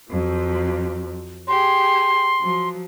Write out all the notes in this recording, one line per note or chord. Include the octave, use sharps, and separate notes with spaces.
F2 F3 F#3
G4 G#4 C6
F3 F#3